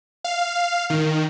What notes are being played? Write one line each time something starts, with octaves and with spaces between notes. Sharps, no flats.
F5
D#3